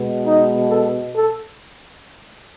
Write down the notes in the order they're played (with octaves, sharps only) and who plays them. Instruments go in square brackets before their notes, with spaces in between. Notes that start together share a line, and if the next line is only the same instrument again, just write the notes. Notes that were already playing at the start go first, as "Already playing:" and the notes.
Already playing: [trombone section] B2 G#3 B3
D#4
A4
A4